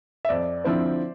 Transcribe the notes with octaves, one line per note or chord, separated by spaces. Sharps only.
E5
F2 D5
D3 F3 C4 E4 C5